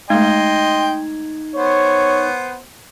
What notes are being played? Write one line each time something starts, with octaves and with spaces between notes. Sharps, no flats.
G#3 A3 D#4 D#5 G5 C6 G#6
B3 C5 C#5